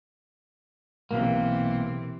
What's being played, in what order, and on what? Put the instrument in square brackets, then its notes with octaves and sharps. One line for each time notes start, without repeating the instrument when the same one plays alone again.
[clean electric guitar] B1 A#3 [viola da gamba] C3 E3 C4